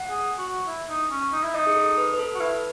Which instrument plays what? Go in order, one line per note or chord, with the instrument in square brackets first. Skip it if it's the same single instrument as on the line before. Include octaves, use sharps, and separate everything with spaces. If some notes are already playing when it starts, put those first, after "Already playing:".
Already playing: [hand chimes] F#5
[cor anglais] G#4
F#4
E4
D#4
C#4
D#4
E4
[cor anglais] D#4 [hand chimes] D#5
[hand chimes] G#4
A4
B4
B4
A4
[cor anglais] F#4
[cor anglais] E4 [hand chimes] B4